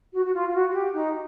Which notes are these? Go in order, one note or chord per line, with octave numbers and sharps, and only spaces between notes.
F#4
F#4
F4
F4
F#4
F#4
G4
D#4